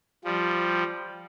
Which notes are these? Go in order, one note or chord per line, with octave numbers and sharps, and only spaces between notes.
F3 G3